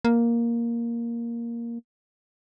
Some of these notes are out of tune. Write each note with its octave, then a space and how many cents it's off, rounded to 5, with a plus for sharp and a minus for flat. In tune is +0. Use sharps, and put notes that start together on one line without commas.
A#3 +5